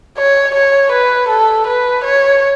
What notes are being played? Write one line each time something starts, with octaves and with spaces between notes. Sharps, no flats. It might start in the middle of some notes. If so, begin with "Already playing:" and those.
C#5
C#5
B4
A4
B4
C#5